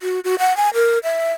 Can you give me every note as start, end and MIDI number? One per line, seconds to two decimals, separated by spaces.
0.01 0.20 66
0.24 0.35 66
0.39 0.56 78
0.57 0.69 80
0.74 0.99 70
1.03 1.32 76